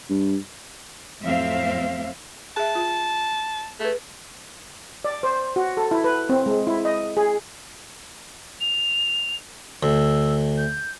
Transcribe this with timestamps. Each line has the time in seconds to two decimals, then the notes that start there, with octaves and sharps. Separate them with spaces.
0.09 G2
1.22 F2 A2 F#3 C4 E5 F5
2.57 G#4 E5 A5
2.75 F4
3.80 A3 G#4 B4
5.05 D5
5.23 C5
5.56 F#4
5.77 A4
5.91 E4
6.04 B4
6.29 C4
6.46 G#3
6.67 E4
6.85 D#5
7.17 G#4
8.61 F7
9.83 D2 E6
10.57 G6